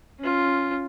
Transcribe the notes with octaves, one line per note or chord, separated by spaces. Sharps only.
C#4 F4